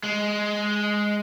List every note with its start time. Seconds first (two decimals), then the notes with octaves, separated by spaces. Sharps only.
0.03 G#3